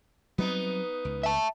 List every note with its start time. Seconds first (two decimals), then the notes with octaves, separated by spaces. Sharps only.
0.38 F#3 G3 B3 C4 D#4
1.05 C#2
1.23 E5 A5